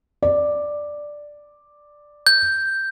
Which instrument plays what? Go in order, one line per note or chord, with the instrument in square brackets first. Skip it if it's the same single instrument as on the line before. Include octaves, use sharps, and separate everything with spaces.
[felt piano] D5
[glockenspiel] G6